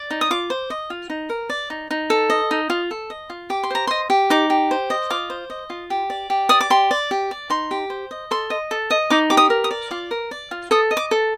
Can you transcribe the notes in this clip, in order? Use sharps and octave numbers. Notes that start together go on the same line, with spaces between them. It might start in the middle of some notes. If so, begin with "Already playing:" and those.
Already playing: D5
D#4
D#6
F4 D6
C5
D#5
F4
D#4
A#4
D5
D#4
D#4
A4
D#5
D#4
F4
A4
D#5
F4
G4 D6
C6
C5 A#5
D#5 C6
G4
D#4 D6
G4
C5
D#5
F4 D6
C5
D#5
F4
G4
D5
G4
D5 D#6
D6
G4 C6
D5
G4
D5
D#4 C6
G4
C5
D#5
A4 C6
D#5
A4
D#5
D#4 D6
G4 D6
D#6
A#4
D#6
D5
F4 D6
A#4
D5
F4
A4 D#6
D#5
D6
A4